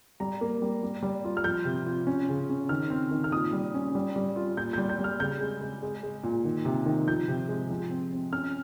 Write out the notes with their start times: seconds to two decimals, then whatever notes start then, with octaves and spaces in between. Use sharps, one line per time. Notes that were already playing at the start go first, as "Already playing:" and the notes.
0.20 G3 A#5
0.41 A#3
0.62 G3
0.83 G3
1.03 G3
1.25 F4
1.37 F6
1.44 F3 G6
1.65 C3
1.86 F4
2.07 C#4
2.29 C#3
2.50 C#4
2.69 D#3 F6
2.90 C4
3.11 D#3
3.24 F6
3.32 A#2 D#6
3.53 G3
3.74 C#4
3.95 G3
4.16 G3
4.36 F4
4.57 A#2 G6
4.73 G3 G6
4.89 G6
4.99 G3
5.04 F6
5.20 C#3 G6
5.40 G#3
5.61 G#3
5.82 G#3
6.03 G#3
6.23 A#2
6.45 D#3
6.65 C3
6.86 D#3
7.07 F3 G6
7.28 C3
7.49 G#3
7.71 F3
7.90 C4
8.12 C4
8.33 C#4 F6